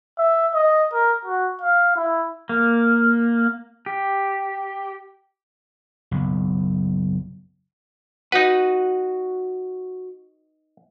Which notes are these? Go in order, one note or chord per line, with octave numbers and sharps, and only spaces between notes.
E5
D#5
A#4
F#4
F5
E4
A#3
G4
F#1 B1
D#4 F#4 B4 F#5